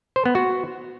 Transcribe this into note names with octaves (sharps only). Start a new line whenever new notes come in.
C5
B3
F#4